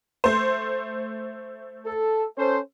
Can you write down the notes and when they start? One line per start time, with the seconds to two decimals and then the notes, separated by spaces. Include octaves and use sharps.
0.24 A3 C5
1.86 A4
2.37 C#4 A4 C5